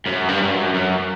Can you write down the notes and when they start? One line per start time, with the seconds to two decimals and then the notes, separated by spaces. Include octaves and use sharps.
0.06 F#2
0.28 G2
0.42 G2
0.51 F#2
0.74 F#2